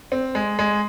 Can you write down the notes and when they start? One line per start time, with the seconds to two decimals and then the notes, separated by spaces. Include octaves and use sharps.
0.12 C4
0.35 G#3
0.59 G#3